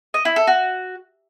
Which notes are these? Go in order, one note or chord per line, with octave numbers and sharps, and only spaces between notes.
D#5
E4
A4
F#4